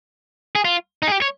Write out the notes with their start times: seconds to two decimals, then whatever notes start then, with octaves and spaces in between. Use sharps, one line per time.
0.55 G#4
0.65 F4
1.02 D#4
1.08 G#4
1.12 G4
1.22 C#5